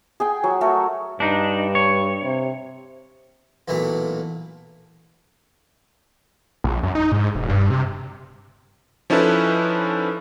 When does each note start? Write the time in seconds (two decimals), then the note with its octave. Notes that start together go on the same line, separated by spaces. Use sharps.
0.20 G#4 G5 G#5
0.44 F#3
0.61 A3 F#4 A#4
1.20 G2 D4 D#4
1.75 C#5
2.23 C3
3.68 B1 A#2 E3 A3
6.64 A#1
6.83 F#2
6.95 D#4
7.12 G#2
7.35 E1
7.50 G2
7.70 C3
9.10 F3 C#4 D#4 E4 A4 B4